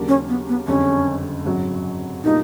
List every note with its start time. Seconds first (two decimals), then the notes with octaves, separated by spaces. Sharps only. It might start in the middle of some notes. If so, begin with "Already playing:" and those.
Already playing: D#2 C#3 F#3 A#3 D4
0.08 C#4
0.28 B3
0.48 B3
0.67 F#1 F2 D3 G3 C#4
1.45 G#1 F#2 C#3 F#3
2.24 B2 G3 A#3 D4 D#4 F4